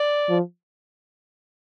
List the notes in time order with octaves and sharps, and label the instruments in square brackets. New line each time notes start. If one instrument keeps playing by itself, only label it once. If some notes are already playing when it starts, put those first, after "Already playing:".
Already playing: [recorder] D5
[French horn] F3